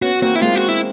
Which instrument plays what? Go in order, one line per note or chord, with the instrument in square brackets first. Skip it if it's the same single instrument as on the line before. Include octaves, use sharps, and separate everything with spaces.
[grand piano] B3 C#4 [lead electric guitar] F#4
[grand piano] A#3 C4 [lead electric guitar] F#4
[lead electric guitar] E4
[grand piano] G#3 A#3 [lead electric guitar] F4
[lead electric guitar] F#4
E4